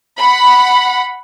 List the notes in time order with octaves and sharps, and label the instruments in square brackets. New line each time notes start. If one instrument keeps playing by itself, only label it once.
[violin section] F#5 B5